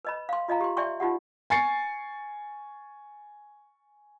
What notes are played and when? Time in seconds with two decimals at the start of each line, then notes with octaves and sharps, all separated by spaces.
0.05 B4 D#5 B5
0.29 F5 C6
0.48 F4 D#5 F5 A#5
0.61 G4 C6
0.77 D5 E5 G5 C6 C#6
1.00 D#4 F4 G4 F#5
1.50 G#5 C#6 A6 C7 C#7